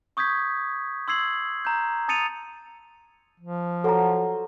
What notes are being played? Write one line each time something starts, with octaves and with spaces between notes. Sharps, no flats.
C#6 D#6 G6 G#6 B6
C6 E6 G#6 C7 F#7
A#5 G6
A5 D#6 A6 C#7 D#7 F7
F3
F#3 A4 C5 A#5